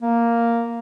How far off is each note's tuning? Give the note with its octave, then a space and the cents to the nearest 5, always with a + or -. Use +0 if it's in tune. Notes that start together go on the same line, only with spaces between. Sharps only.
A#3 +0